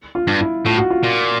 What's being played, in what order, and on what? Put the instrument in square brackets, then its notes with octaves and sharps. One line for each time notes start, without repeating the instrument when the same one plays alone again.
[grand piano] F4
[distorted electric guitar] G2
[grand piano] E4
[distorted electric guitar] A2 [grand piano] F4
[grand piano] F#4
F4
[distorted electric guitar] A#2